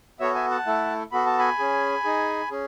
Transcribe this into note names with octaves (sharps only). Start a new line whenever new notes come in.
B3 F#4 A4 C#5 E5
E5 G#5
F#5 A5
A3 E4 A4
B3 F#4 A4 B5
A5
G#5 B5
C#4 G#4
D#4 G#4
C#4 G#4